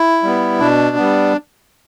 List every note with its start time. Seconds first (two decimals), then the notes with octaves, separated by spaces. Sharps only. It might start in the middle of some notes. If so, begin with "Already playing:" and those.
Already playing: E4
0.23 G3 B3
0.59 B2 D4
0.97 G3 B3